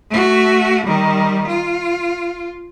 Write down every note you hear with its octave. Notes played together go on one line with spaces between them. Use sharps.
A3 F#4
D#3 G3
F4